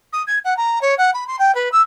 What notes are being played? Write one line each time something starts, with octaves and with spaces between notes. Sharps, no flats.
D#6
G#6
F#5
A#5
C#5
F#5
B5
C6
G5
B4
E6